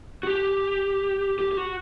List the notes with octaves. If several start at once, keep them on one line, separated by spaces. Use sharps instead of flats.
F#4
G4
G4
G4
F#4